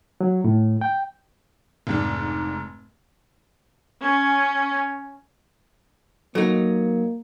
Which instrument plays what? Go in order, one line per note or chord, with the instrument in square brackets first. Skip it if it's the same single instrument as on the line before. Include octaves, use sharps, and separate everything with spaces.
[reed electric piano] F#3
A2
G5
[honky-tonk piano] F1 G#2 D4
[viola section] C#4
[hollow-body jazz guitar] F#3 D#4 [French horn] A#3 [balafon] A4